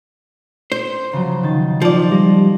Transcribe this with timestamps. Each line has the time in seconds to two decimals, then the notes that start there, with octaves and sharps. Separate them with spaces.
0.72 C5
1.13 C#3 F3 F#3
1.43 D#3 A6
1.82 F3 D5
2.12 G3 A#6